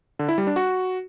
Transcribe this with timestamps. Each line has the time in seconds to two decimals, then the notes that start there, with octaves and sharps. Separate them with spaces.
0.19 D3
0.29 E4
0.38 G3
0.47 D4
0.56 F#4